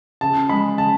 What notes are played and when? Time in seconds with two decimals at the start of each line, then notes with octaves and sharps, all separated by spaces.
0.21 C#3 A5
0.49 G#3 B5
0.78 C#3 A5